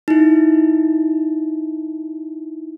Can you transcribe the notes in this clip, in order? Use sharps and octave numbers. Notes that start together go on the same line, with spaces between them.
D#4 E4